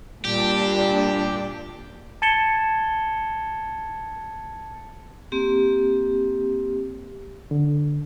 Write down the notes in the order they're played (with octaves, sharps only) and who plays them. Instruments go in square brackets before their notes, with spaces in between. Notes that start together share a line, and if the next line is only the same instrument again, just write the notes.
[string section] A#2 D4 [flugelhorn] G3 [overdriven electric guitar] G4
[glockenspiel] A5 G#6 A6 C#7 E7 G7
[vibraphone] A#3 C4 G4
[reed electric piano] D3